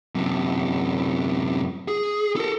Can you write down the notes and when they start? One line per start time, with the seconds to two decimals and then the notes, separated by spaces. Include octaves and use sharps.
0.15 F#2 C3
1.88 G#4
2.36 A4 A#4